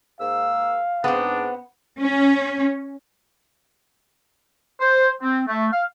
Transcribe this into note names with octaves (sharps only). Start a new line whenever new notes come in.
G#2 A#3 F5 E6
G#2 B3 C4 D4
C#4
C5
C4
A3
F5